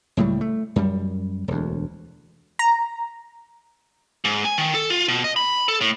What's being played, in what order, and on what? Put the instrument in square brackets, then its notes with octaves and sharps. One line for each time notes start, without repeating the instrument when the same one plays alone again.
[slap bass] C#2 A2 F#3 G3
A3
F#2 G3
E1 D2
[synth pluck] A#5
[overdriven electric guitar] G#2
G#5
D#3
A4
F4
B2
D#5
B5
A4
A2